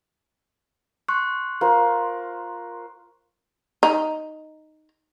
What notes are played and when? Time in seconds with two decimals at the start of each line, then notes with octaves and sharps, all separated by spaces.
1.08 C6 C#6 F#6
1.61 F4 A#4 C5
3.83 D#4